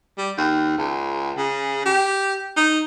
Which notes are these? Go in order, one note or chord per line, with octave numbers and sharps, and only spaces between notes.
G3
D#2
C#2
C#3
G4
D#4